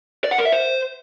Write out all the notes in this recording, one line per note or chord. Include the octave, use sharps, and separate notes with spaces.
D5
F#5
A#4
E5
C5